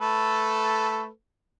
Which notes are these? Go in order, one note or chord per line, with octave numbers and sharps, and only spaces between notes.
A3 A4 B4